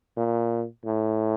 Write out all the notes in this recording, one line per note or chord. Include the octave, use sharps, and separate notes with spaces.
A#2
A2